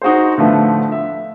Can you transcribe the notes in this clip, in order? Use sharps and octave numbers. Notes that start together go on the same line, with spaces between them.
D#4 F#4 G#4 C5
A2 D3 F3 A3 B3
E5